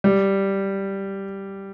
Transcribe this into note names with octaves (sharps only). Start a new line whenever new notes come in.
G3